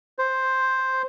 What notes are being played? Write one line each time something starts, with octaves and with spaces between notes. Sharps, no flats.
C5